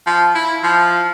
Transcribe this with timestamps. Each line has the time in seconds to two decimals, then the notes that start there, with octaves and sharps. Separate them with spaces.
0.07 F3
0.35 E4
0.64 F3